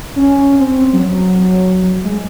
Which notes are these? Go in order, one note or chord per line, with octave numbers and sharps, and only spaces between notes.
C#4
C4
F#3
G#3